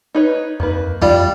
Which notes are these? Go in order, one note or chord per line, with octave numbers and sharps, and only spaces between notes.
D#4 B4 C#5
F2 D#3 A#3 B4
F2 G3 E4 F4